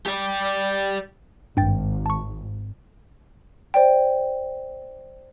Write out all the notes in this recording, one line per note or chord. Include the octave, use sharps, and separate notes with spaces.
G4 D5
G#1 G2 G5 A6
A5 C#6
C5 D5 G5